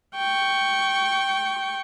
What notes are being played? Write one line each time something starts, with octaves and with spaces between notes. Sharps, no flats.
G5 C#6